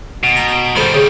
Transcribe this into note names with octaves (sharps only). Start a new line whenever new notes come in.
B2
A#5
D#3 G3 A4 C5 B5
C#3